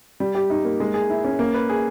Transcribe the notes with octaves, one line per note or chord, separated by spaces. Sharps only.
G3
G4
D#4
A#3
G#3
G#4
E4
C#4
A#3
B4
G#4